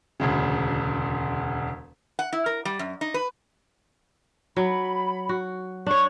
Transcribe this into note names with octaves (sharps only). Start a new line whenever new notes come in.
E1 D2 C#3
F#5
E4
A#4
G3
F#2
D#4
B4
F#3 B5
F#4
D4 C#5 C#6